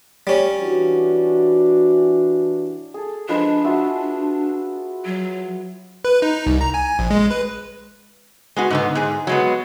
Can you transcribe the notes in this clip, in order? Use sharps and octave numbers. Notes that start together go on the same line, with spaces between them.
G3 C#4
E3 D4 F#4
G#4 A4
F3 G#3 D4 B4
F4 F#4 E5
F#3
B4
D#4
C2
A#5
G#5
A#1
G#3
B4
G#3 B3 F#4
G#2 D3 B3
G#2 G#4
F#3 G#3 B3